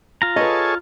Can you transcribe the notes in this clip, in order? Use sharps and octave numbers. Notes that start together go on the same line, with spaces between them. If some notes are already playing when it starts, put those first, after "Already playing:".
F4 A#5
G#4 A4 B4 C#5 D#5